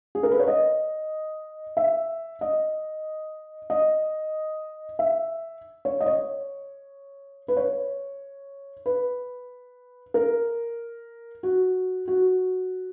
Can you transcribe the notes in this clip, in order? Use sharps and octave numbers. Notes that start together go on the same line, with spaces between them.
G#4
A#4
B4
C#5
D#5
E5
D#5
D#5
E5
C#5
D#5
C#5
B4
C#5
B4
A#4
F#4
F#4